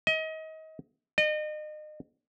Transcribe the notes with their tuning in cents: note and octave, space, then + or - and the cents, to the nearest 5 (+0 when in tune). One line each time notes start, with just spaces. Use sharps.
D#5 +30
D#5 -35